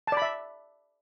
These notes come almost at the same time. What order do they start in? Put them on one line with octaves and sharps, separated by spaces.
A5 D5 B5 E5